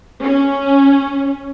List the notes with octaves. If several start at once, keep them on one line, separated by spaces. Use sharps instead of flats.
C#4